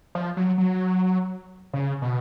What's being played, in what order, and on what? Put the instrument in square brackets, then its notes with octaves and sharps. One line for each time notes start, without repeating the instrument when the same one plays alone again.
[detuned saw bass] F3
F#3
F#3
C#3
B2